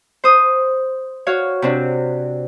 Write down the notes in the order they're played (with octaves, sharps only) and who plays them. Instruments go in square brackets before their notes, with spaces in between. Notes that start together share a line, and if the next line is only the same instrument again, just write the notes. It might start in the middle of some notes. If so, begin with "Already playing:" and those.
[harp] C5 D#6
F#4 C#5 F5
C3 C4 D4